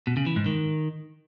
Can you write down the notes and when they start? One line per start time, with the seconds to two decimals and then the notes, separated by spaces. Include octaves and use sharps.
0.07 B2
0.17 C#3
0.27 E3
0.36 G#2
0.46 D#3